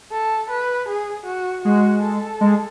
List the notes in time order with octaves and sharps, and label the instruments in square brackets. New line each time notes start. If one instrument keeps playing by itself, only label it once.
[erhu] A4
B4
G#4
F#4
[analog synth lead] G#3 [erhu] F#4
[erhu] A4
[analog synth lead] G#3